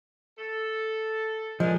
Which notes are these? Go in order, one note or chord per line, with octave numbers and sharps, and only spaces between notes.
A4
F3 G#3 C#4 D4 A#4